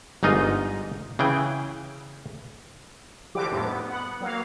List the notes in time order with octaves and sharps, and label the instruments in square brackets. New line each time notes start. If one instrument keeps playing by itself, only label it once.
[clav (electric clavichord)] G1 G#2 D#4 F4 D#5
C#3 E3 G#4 G5
[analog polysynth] D3 E3 F3 G4 D6
F2 A2 D3 D#3 G3
B3
B3 F#5
F#3 A#3 F5